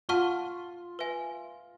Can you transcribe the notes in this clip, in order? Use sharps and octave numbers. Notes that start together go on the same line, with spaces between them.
F4 F#5 A5 C#6 F6
B4 E5 G#5